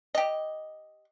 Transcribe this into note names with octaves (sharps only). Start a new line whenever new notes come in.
G4 D#5